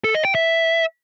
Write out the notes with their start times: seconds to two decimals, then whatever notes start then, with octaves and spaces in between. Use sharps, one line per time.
0.04 A4
0.14 D#5
0.25 G5
0.35 E5